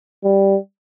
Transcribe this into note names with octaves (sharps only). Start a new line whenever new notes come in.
G3